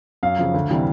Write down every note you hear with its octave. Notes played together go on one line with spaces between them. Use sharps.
F#2 F5
C#3 F3
D2
C3 E3 G3